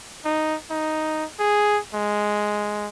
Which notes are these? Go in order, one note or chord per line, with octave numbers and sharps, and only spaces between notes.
D#4
D#4
G#4
G#3